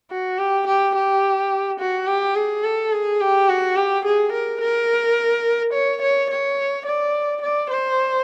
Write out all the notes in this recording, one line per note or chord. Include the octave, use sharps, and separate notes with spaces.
F#4
G4
G4
G4
F#4
G4
G#4
A4
G#4
G4
F#4
G4
G#4
A#4
A#4
C#5
C#5
C#5
D5
D5
C5